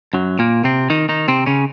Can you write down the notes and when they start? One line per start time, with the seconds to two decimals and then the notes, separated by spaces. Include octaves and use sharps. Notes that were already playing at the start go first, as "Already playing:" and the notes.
0.13 F#2 F#3
0.39 A#2 A#3
0.64 C3 C4
0.90 D#3 D#4
1.09 D#3 D#4
1.28 C3 C4
1.46 C#3 C#4